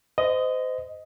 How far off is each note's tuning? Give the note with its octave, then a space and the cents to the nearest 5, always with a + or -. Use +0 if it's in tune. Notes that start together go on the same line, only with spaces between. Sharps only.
C5 -30 D#5 +0